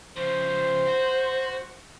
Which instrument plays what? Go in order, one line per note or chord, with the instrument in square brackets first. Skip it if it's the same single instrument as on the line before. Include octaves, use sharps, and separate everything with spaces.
[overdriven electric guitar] C#3 F3 [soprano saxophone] C5
[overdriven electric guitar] F#4